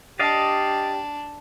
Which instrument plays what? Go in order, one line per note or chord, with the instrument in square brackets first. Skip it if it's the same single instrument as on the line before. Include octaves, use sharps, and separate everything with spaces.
[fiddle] D4 [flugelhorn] G4 [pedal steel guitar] D5 D#5 F5